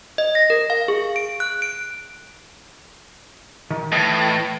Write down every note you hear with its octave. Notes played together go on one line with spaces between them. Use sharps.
D#5
A#6
A#4
F5
G#4
D7
F#6
D7
D#3
A2 E3 A4 D#5